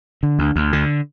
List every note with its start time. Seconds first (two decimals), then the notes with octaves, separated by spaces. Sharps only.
0.23 D3
0.39 D2
0.56 D2
0.73 D3